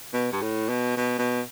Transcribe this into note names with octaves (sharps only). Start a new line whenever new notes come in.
B2
G2
A2
B2
B2
B2